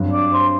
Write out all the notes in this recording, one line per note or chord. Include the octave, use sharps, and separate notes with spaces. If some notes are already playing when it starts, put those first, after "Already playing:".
Already playing: G2 F#3 C4
D5
C5